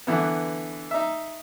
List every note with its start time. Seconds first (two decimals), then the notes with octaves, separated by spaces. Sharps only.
0.07 D3 E3 B3
0.91 D#4 E5